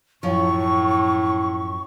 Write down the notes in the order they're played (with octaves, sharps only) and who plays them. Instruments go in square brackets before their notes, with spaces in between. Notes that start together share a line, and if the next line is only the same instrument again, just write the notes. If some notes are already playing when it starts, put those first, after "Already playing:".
[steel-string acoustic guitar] F#2 F3 [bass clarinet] A2 [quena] C#6